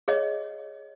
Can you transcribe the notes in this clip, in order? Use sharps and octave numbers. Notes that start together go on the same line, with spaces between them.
G#4 C#5 D#5